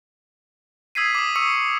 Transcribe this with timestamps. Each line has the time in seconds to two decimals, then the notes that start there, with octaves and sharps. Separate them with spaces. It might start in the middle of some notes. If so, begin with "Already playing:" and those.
0.95 D#6 E6 G#6 B6 C7 D#7
1.15 D6 D#6
1.36 C#6 D#6 E6 C#7